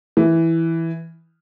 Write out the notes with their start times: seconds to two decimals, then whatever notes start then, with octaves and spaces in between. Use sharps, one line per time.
0.17 E3